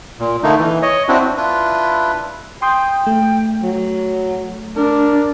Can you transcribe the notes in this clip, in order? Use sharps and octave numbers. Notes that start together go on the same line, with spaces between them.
A#2
D3 A3 A#3 D#4
E3
C#5 D#5
C4 D4 E4 F#4
D4 E4 F4 B4
G5 C6 D#6 G6
A3
F#3
D4 A#4